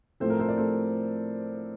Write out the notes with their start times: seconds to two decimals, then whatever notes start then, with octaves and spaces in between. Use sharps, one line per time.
0.20 A2 F3 A3 C4 A4 C5
0.30 A#4
0.39 A4 C5
0.48 A#4 D5
0.58 A2 F3 A3 C4 A4 C5